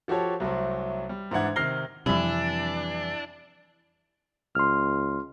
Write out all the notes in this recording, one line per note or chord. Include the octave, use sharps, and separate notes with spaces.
F3 F#4 G4 A4 C#5
C2 F#3 A3 C4
G3
G#2 E3 D4 F#5 G#6
C3 D#3 F6 A#6 C7 G7
F2 C3 E3 G3 D4 E4 E5
C#2 C6 F6